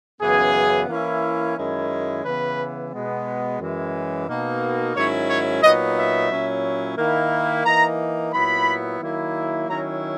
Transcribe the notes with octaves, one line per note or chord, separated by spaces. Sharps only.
F#2 C#3 E3 B3 G#4
E3 A#3 C#4 E4
F#2 D#3 G#3 C#4 E4
C#3 E3 B3 B4
B2 G#3 B3
F#2 E3 G#3
B2 A#3 D#4
G#2 D#3 F#3 C#4 E4 C#5
C#5
A#2 F#3 B3 D#4 D#5
E5
A#2 F#3 C#4 E4
D#3 A#3 E4
E3 A#3 D#4 A#5
A#2 F#3 B3 E4 B5
D#3 F#3 A#3 E4
D#3 F#3 C#4 E4 A#5